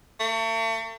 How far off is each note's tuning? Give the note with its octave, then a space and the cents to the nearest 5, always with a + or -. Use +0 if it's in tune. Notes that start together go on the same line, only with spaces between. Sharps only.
A3 +40